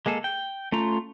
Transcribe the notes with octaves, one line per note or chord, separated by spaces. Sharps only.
G#3 A#3 G#4 A4
G5
A3 C#4 F4 A#5